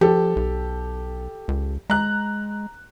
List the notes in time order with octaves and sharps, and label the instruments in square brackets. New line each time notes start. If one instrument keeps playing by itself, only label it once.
[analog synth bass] F3 [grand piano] G4 A4
[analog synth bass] B1
C#2
[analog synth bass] G#3 [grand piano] A#5 F#6